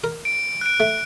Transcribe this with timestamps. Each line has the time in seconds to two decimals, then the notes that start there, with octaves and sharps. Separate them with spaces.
0.04 A#4
0.25 D7
0.61 F#6 D7
0.80 A3